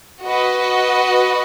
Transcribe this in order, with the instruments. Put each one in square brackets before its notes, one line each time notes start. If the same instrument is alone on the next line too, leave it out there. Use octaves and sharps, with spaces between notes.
[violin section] F#4 B4 D#5